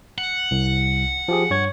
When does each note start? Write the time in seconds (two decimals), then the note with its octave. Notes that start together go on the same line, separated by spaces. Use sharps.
0.18 F#5
0.51 C2
1.28 F3 G4 G#4
1.50 G2 C#5 G#6